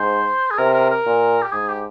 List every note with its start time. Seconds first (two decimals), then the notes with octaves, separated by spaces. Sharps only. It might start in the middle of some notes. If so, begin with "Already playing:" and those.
Already playing: G#2 C5
0.51 G#4
0.58 C3 A#4
0.74 A#4
0.90 A#4
1.06 A#2
1.42 G4
1.52 G#2 G#4
1.68 G4